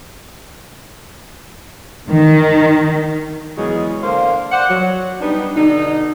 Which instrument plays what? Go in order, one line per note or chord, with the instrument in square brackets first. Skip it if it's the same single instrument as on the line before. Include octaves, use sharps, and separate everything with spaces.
[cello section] D#3
[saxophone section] E2 C#3 F#3 G#3 G#4
D3 A#3 C5 F5
C5 D5 F#5
F#3
G3 B3 D4 D#4
B2 D3 D#4